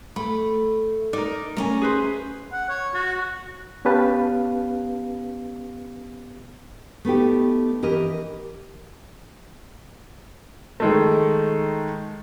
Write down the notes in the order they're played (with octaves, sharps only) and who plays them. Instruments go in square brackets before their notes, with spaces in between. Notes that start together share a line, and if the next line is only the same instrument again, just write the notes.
[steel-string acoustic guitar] A3 [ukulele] B5
[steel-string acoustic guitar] D#4 [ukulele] A#4 D5
[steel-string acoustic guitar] A3 C#4 G#5 [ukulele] A#4
[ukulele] G#4 B4 C5
[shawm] F#5
C#5
F#4
[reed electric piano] B3 C#4 G4 B4 F5 A5
[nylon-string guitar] A3 B3 D#4 G4
E3 G4 A#4 D#5
[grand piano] D#3 G#3 A3